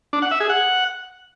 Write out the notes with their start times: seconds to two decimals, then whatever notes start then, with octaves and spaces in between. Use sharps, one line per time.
0.13 D4
0.22 F#5
0.31 E5
0.40 G#4
0.50 F#5